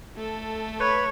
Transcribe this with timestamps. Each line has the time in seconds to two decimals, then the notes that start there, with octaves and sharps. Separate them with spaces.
0.16 A3 A4
0.80 B4 C#5